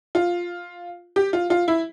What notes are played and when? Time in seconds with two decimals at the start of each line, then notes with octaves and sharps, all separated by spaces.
0.15 F4
1.16 G4
1.33 F4
1.50 F4
1.68 E4